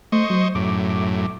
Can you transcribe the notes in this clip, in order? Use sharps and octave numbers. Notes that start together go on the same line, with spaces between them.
A3 C5 D#5 C#6
F#3
F#2 A2 D6
D6